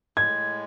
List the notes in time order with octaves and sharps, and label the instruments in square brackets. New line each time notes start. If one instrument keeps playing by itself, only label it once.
[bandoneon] A2 G#3 [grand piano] G#6